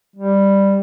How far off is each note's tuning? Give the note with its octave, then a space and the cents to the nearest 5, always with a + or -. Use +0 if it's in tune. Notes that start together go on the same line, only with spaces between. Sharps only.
G3 +5